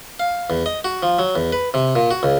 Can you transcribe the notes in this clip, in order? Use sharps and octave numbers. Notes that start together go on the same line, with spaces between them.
F5
E2
D#5
F#4
F3
F#3
E2
B4
C3
A#2
F#4
C#2